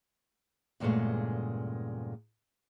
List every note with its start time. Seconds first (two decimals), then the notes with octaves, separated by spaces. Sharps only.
0.80 E2 G2 A#2 C#3 G#3 A3